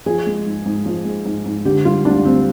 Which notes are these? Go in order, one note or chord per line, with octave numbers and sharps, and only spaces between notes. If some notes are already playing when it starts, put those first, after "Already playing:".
F3 G#4
G#3
G#2
G#2
F3
G#3
G#2
G#2
D3 G4
G3 F4
D2 D4
D2 C4